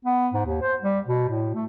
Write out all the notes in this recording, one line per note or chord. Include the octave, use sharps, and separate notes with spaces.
B3
G#2
D#2
C5
G3
B2
A2
A3